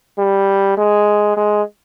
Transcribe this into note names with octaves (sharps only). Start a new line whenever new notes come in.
G3
G#3
G#3